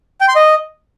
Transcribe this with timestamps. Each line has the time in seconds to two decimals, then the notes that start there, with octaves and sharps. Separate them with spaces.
0.21 G5
0.28 C6
0.36 D#5